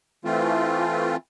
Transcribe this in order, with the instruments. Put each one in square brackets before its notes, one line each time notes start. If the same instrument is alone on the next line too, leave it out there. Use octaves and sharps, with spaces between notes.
[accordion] E3 A3 C4 F4